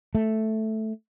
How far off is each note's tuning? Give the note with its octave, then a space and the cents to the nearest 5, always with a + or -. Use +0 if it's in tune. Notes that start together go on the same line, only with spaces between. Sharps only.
A3 -5